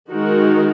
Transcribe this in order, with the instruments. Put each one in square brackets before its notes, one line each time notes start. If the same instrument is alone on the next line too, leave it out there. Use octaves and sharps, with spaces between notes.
[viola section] D#3 G#3 D#4 F#4 A#4